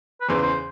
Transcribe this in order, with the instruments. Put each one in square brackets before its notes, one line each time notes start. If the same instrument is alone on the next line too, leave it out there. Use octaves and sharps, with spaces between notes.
[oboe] B4
[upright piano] E2 C#3 E3 [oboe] C5
[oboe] C5